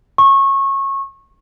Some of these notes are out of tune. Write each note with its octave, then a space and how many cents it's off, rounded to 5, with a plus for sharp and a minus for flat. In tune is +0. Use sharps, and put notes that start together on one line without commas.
C#6 -20